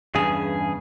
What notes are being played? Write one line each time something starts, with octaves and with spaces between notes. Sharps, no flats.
E2 G2 C#3 G#4